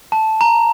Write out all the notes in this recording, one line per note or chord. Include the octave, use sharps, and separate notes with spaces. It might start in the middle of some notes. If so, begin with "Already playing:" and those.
A5
A#5